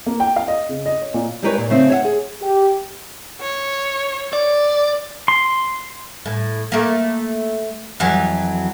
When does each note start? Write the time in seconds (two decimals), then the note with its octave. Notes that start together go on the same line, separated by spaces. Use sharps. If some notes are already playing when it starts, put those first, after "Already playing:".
0.06 A#3
0.20 G5
0.36 F5
0.48 D#5
0.69 C#3
0.86 D#5
1.02 C#5
1.14 A#2
1.43 G3 G#3 D#4 A#4 B4 C#5
1.58 A#2
1.70 C#3 A3 C4 D#4
1.89 C#5 E5 F#5
2.05 G#4
2.42 G4
3.42 C#5
4.33 D5
5.28 C6
6.26 A2
6.72 A3 A#3
8.00 F2 E3 F#3